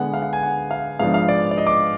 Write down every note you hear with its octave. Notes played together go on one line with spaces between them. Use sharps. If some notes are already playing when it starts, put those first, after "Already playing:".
Already playing: D3 G#3 B3 F#5
F5
F#5
G#5
F#5
F5
G#2 F3 B3 D4 F5
F5
D5
D5
D#5
D6